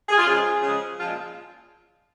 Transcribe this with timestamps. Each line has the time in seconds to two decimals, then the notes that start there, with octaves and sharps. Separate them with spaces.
0.09 G#4
0.17 F4
0.27 C#3 F3 G#3 G#4
0.63 C#3 F3 G#3
0.98 A#2 F3 G#3 F4